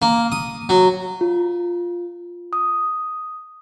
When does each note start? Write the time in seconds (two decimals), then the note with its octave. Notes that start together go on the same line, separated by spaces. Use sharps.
0.02 A#3
0.32 D#6
0.69 F#3
1.21 F4
2.53 D#6